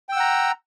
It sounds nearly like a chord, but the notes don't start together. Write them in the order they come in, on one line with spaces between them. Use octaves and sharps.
G5 E6 F#5 A#5